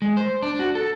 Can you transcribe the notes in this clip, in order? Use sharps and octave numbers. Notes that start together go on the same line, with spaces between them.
G#3
C5
D4
F#4
A4